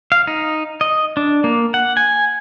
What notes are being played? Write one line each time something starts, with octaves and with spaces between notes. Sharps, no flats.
F5
D#4
D#5
D4
A#3
F#5
G#5